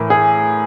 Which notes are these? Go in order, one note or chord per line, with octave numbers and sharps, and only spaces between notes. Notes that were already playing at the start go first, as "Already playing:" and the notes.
Already playing: A2 E3 A#4
G#4